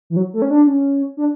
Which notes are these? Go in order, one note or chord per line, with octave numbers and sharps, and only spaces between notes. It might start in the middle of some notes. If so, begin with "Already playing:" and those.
E3
F#3
A3
C#4
D4
C#4
D4